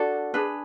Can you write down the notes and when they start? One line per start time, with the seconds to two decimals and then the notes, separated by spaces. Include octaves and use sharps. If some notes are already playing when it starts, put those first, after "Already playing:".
Already playing: D4 F#4 A4 D5
0.34 D4 G#4 B4